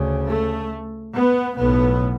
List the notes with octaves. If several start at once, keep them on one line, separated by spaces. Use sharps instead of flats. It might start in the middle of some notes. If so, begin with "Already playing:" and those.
Already playing: D2 C#3
A3
B3
B1 A2 B3